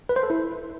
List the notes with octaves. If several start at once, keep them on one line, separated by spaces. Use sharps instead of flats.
B4
C5
A4
E4